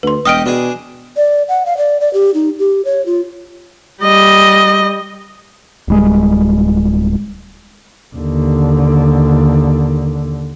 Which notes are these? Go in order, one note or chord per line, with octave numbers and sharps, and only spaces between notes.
D2 B4 C6
E1 D#4 G4 D#5 D#6 F6 D7
B2 D4 G#4
D5
F#5
F5
D5
D5
G4
D#4
G4
C#5
F4
G3 D#5
D1 G3 G#3
D#2 D3